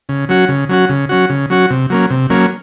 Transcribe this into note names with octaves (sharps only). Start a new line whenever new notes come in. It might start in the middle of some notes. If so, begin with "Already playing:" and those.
C#3
F#3 C#4 F#4
C#3
F#3 C#4 F#4
C#3
F#3 C#4 F#4
C#3
F#3 C#4 F#4
C3
F#3 A#3 C#4
C3
F#3 A#3 C#4